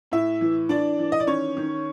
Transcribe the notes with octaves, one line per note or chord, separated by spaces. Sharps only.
A2 E4 E5
E3
E3 D4 D5
E3
D#5
D5
D#3 C#4 C#5
D#3